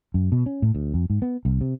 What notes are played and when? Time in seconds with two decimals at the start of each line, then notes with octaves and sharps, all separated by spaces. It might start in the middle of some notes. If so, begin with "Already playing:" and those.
0.14 F#2
0.32 B2
0.46 C#4
0.62 A2
0.75 D2
0.94 F2
1.10 G#2
1.22 B3
1.45 C2
1.61 C3